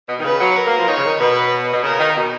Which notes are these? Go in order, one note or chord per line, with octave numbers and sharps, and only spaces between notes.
B2
D#3
C#3 B4
F#3
A#4
A#3
F3
D#3 C#5
C#3
D#3
B2 B4
B2
C#3 A#4
D#3
B2